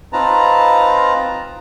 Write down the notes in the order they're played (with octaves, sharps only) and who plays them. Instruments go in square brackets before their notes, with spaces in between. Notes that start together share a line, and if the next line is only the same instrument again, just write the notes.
[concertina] C4 D#4 F4 B4 A5 A#5